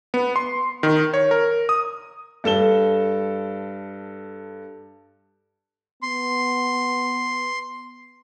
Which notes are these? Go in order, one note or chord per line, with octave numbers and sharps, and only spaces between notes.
B3
C6
D#3
C#5
A#4
D#6
G2 A4 E7 G7
B3 C6